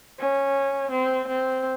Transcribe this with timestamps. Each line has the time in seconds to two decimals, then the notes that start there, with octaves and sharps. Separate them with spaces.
0.20 C#4
0.91 C4
1.28 C4